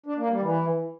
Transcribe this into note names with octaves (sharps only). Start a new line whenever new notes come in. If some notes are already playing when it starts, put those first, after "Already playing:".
D4
A#3
G3
E3